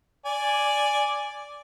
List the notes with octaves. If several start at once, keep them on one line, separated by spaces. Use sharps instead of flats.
D5 G#5